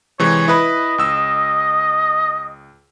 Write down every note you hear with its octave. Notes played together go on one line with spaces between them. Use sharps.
C3 E3 G#3 C#5
E4 B4 D#5 B5
C#2 E6 E7